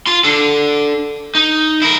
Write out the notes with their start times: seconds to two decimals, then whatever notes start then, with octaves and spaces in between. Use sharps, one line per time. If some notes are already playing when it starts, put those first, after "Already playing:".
0.07 F4 C6
0.24 D4 A4
1.35 D#4
1.82 E4 A#4